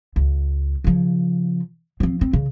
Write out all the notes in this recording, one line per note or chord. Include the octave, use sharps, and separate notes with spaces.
C#2
C#3 F3
F3 C4
C4
C#3